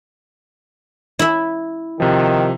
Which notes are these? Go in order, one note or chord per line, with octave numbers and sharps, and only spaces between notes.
E4 E5
C3 D#3 F3